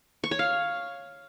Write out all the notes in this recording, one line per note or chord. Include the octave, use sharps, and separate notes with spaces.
C#6
C#5
F5